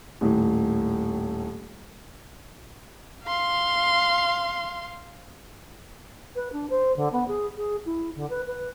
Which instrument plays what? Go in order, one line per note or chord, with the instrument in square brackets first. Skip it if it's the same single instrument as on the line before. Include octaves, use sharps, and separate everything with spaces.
[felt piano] D#1 A2
[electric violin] F5 C6
[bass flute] B4
D4
C5
D3
B3
G#4
G#4
E4
D3
B4
B4